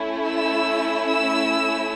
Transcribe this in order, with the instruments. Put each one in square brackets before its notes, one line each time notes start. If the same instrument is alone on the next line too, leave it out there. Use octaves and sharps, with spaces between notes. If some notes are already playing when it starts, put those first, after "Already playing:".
Already playing: [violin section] A3 C#4 E4
E6
E6